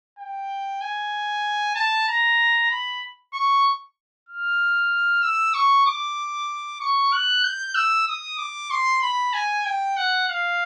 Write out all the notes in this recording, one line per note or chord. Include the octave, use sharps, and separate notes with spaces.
G5
G#5
A5
A#5
B5
C#6
F6
E6
C#6
D6
C#6
F#6
G6
E6
D#6
D6
C6
B5
G#5
G5
F#5
F5